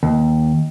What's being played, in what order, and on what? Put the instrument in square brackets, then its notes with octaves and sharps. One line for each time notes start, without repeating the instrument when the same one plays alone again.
[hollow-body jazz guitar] D#2